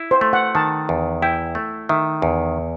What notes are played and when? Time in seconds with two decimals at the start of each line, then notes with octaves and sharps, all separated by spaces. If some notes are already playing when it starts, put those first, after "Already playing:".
Already playing: E4
0.11 C5
0.21 A3
0.33 F#5
0.55 D#3 A5
0.89 E2
1.22 E4 G5
1.55 A3
1.89 D#3 E5
2.22 E2